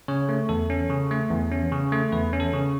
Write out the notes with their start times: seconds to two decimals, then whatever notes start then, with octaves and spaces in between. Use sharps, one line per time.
0.08 C#3 C#5
0.29 A3
0.49 E2 A4
0.70 C#4
0.90 C#3
1.11 A3
1.31 E2
1.52 C#4
1.72 C#3
1.92 A3
2.12 E2 B4
2.33 C#4
2.40 A4
2.53 C#3